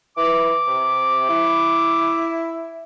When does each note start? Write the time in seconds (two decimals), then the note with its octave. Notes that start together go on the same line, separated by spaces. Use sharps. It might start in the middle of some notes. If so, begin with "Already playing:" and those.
0.17 E3 D6
0.67 C3
1.29 E4